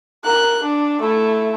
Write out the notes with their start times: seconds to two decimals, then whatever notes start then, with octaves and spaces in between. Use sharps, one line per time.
0.24 A#4 F#6
0.62 D4
1.01 A3 E4